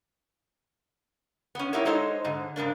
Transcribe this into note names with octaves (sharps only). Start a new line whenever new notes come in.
B3 C#4
B3 D#4 E4 G4 A#4 C#5
G#3 D#4 A4 C5 C#5 D#5
G#2 D3
G#2 C#3 A#3 D4